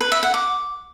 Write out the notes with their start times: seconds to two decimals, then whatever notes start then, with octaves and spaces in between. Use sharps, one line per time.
0.01 B4
0.12 E5
0.23 F#5
0.34 D6